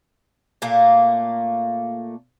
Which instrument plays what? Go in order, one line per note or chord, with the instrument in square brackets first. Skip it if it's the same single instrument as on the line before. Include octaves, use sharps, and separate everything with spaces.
[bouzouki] A#2 A3 A#3